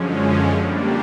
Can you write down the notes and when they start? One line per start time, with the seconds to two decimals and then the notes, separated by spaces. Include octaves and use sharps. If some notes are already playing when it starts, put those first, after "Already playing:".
Already playing: F#2 D3 F3 G#3 C#4
0.51 G3 A#3 D4